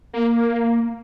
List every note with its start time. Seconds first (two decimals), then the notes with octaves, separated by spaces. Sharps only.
0.14 A#3